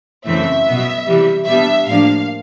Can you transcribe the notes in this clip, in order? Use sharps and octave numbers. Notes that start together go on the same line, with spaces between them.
F#2 C#3 E3 A3 C4 E5
B2 F#3 B3
C3 E3 G3
B2 G3 B3 D4 E5
A2 F3 A#3 D4 F5